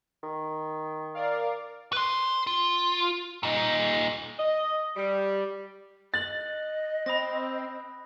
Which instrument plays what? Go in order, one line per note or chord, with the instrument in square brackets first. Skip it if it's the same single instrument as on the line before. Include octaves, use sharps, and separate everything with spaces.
[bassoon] D#3
[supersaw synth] A#4 D5 F5
[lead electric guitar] B4 C6
F4
A#2 D#4
[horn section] D#5
G3
[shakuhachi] D#5 [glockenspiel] F#6 F#7 [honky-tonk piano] A6
[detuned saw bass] C4 [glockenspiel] B5 D#6 A#6